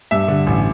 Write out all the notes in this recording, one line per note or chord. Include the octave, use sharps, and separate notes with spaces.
G2 E5
D3
A1